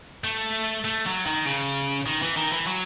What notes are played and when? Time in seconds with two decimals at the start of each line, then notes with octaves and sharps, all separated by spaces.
0.24 A3
0.85 A3
1.06 F#3
1.26 D#3
1.45 C#3
2.06 D#3
2.22 E3
2.36 D#3
2.52 E3
2.67 F#3